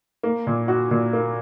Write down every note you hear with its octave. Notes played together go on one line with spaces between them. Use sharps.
A#3
A#2
F#4
A#2
A#3